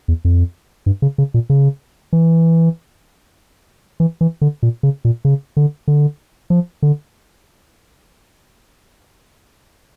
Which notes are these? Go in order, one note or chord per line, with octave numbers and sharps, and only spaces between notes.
E2
F2
G2
C#3
C#3
A#2
C#3
E3
E3
E3
D3
A#2
C#3
A#2
C#3
D3
D3
F3
D3